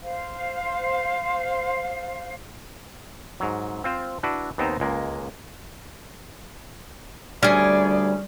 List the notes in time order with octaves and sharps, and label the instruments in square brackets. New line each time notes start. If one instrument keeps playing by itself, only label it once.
[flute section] C5 F5
[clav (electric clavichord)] G#2 F#3
C4 F4 C5
D4 E4 F#4 B4
D#2 B3 C4 D#4 C5 A#5
C#2 G#3 A#3
[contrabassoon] D2 [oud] G3 [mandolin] C#4 G#4 [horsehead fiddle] D5